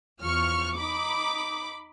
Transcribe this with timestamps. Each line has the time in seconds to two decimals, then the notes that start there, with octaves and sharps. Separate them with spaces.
0.21 E2 F3 C#6 F6
0.76 D#4 B5 D6